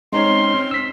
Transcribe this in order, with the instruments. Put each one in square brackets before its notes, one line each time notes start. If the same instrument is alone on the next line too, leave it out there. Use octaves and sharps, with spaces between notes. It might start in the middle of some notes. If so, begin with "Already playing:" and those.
[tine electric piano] G#3 D#4 C#5 [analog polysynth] C4 C#4 F6 [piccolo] C6
[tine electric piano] E6 B6